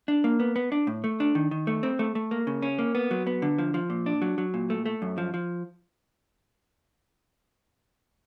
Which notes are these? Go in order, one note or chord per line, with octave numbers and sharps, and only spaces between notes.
D4
A#3
B3
B3
D4
A2
A3
D4
D#3
D#3
A3
C4
A3
A3
A#3
C#3
C#4
A#3
B3
F#3
B3
D3
F3
F3
A#2
D4
F#3
F#3
A#2
A3
A3
F#2
F3
F3